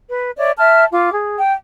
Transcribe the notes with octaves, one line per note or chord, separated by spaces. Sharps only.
B4
C#5 D5 E5
E5 A5 F6
F4 D6
G#4
G5